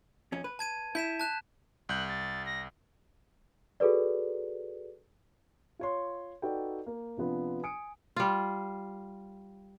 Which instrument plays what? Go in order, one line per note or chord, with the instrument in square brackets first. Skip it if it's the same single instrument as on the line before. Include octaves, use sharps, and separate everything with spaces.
[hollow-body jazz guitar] F2 C#4
B4
[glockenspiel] A5 G#6 D#7
[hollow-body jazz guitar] E4 [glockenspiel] G6 B6 E7
[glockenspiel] A5 F#6 E7
[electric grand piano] C2 G6 [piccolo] F#6
[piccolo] A6
A#6
[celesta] F#4 G#4 A4 B4 D5
[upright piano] F4 C#5 C6
D#4 F#4 A4 B4 D5 G5
A#3
C3 F3 B3 D4 F4
G#5 D#6 C#7 D7
[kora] G3 F4